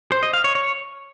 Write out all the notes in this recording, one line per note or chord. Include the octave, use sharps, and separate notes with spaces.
C5
D#5
F5
C#5
C#5